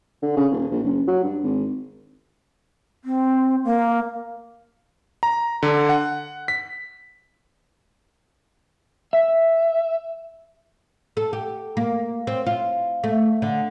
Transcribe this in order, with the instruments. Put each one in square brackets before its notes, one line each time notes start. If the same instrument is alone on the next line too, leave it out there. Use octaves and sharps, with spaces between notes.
[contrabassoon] D3
C#3
D#1
A#1
F#1
F#3
G2
G#1
[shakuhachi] C4
A#3
[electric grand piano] A#5
D3
F#5
B6
[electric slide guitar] E5
[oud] A4
G4
A#3
C4
F4
A3
D3